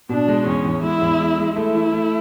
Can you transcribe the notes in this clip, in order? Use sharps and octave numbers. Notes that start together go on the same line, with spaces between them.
B2 D4
G#3
E2 C#4
E2
G#3 E4
E2
G#3
G#3
A3 E4
E3
A3